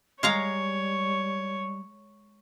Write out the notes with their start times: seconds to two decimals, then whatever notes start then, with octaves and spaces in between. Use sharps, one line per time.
0.23 G3 G#3 C#5 F5 A#5